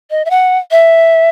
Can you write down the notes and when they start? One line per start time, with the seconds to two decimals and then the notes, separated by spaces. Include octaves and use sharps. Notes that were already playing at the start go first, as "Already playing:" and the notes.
0.11 D#5
0.25 E5
0.30 F#5
0.71 E5